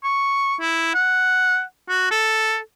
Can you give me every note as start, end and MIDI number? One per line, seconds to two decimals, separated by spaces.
0.04 0.55 85
0.60 0.92 64
0.94 1.62 78
1.89 2.10 66
2.11 2.59 69